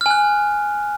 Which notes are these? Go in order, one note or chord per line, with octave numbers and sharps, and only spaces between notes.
G#5 F6 F#6